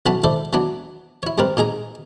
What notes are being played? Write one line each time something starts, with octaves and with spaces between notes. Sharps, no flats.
B1 E3 C#4 F#4 A5 B5
E4 A4 C5 D5
E3 F#3 B3 D4
E4 C#5
G2 G3 C4 A#4 B4
A#2 D#4 G#4 A#5